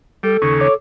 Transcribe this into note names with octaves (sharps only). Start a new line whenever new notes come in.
G3 A4
D#2 C#3 C#6
C#5 D6